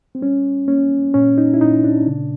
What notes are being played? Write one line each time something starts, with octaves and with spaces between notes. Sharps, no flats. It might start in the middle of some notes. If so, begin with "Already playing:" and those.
C4
G3 C#4
A#3 C#4
A#2 C#4
D#4
E4
A#2 D#4
D4
C#3